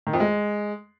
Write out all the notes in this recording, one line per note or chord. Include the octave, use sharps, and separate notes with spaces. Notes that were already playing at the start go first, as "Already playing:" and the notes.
D#3
F2
G#3